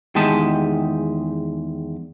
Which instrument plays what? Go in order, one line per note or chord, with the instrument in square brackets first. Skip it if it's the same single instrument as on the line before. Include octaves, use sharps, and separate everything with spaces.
[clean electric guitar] E2 D#3 G#3 G4 D#5 A5